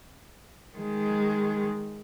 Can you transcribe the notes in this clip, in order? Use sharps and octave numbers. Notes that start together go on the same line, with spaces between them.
D#3 G#3